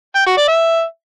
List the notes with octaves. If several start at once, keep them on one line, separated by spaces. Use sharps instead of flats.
G5
F#4
D5
E5